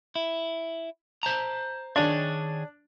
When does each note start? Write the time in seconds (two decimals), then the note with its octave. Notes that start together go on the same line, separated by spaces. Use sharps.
0.15 E4
1.23 C5 A5 A#5
1.96 D#3 D4 G#4 C#5